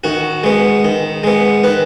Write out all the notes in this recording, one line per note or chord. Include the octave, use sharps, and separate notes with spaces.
D#3 F#4
G#3 B3
D#3
G#3 B3
D#3 B4